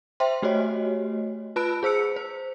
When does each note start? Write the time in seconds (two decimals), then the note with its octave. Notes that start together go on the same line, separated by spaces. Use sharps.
0.20 C5 E5 G5 C6
0.42 A3 F#4 G4 C#5 D#5
1.56 F4 B4 A5 B5 F#6 D7
1.83 G#4 C5 E6 C#7
2.16 C5